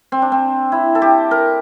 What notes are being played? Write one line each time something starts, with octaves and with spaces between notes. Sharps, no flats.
C4
D4
C4
E4
A4
G4
A#4